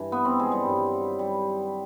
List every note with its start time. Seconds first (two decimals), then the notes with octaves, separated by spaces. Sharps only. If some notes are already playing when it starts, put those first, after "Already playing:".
Already playing: G2 E3
0.12 B3
0.25 C4
0.39 G#3
0.52 G3
0.65 G2 D#3 F#3
1.19 G3